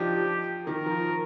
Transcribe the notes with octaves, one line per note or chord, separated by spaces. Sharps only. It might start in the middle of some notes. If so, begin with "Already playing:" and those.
Already playing: F3 D4 D#4 G4
D#3 A#4
F3